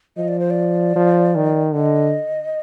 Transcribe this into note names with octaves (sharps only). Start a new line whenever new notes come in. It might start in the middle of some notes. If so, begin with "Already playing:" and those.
F3 D#5
D5
C5
D5
F3
D#3
D3 D#5